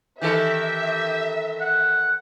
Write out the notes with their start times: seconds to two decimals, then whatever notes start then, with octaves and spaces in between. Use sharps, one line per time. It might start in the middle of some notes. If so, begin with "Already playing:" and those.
0.21 D#3 E3 G4 A4 E5
1.61 F#5